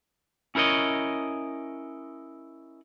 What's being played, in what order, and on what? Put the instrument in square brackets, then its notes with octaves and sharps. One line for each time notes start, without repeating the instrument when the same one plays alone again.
[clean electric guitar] C#4 E4 A#4 C#5 D#5